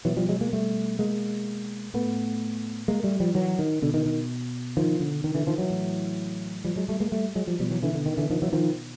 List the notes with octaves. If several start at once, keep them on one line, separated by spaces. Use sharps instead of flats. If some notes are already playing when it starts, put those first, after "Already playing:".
B2 E3 F#3
F3 G3
F#3 G#3
G#3 A#3
G3 A3
G#3 A#3
A2 A3 B3
G#3 A#3
G3 A3
F3 G3
E3 F#3
D#3
B2 D3
D#3
D#3
D#3 F3
D3
D#3
D3 E3
D#3 F3
E3 F#3
A2
F3 G3
F#3 G#3
G3 A3
G#3 A#3
G3 A3
F#3 G#3
F3 G3
B2 F3 G3
E3 F#3
D3 E3
D3
D#3
D3 E3
D#3 F3
E3 F#3
D#3 F3